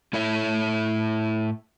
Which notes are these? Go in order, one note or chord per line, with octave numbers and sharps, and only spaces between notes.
A2 E4 A4 C#5 E5